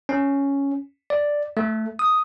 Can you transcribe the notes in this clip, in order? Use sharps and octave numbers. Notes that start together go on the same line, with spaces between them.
C#4
D5
A3
D#6